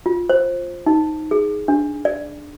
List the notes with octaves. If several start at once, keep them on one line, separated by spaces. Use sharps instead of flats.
F4
C5
D#4
G#4
D4
D5